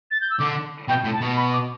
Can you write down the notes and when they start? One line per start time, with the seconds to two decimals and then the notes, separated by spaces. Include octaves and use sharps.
0.11 A6
0.21 G6
0.30 E6
0.39 D3 D6
0.88 B2 G5
1.04 A2
1.13 A5
1.21 B2
1.36 B5
1.53 D6